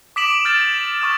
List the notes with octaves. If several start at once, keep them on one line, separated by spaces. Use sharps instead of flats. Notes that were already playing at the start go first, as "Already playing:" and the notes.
D6 D#6 B6 D7 E7 F#7
F6 G6 A6
C#6 D#6 F6